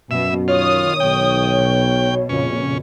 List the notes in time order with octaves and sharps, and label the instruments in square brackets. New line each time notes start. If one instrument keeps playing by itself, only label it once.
[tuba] F#2 [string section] B2 [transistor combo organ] E5
[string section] D#3 D#6 [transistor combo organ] F4 [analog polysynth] C#5
[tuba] B1 [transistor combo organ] G5
[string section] B2
[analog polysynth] F2 A#2 C#3 [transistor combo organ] C#4